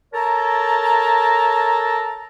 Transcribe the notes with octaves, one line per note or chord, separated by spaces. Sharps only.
A4 A#4 C#5 A5 A#5